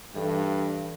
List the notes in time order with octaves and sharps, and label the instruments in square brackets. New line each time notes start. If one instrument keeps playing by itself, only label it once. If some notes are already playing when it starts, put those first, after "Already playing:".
[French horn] G2 [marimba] E3 A4